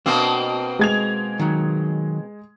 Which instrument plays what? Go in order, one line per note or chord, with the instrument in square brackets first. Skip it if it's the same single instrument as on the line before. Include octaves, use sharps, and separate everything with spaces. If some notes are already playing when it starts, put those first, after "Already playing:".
[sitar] B2 A#3 C4 [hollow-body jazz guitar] D4
[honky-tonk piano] G#3 G#6 F7
[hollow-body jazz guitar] D#3 F#3